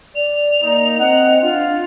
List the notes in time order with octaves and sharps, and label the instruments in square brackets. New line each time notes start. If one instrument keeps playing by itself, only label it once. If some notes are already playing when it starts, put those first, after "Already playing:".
[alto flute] D5 [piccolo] F7
[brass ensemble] A#3 D#4
[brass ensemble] C4 F#5 [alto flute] D#5
[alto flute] D4 [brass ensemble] F4